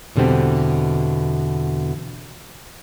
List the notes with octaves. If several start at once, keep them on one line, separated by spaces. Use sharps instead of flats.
E2 B2 D3 G3 C4